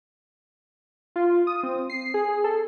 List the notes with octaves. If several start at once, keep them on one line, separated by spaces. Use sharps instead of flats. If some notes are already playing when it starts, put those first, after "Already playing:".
F4
D#6
C4
C7
G#4
A4